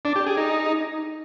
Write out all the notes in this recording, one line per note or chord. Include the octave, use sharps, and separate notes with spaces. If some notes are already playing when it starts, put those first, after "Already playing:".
D4
G4
G#4
D#4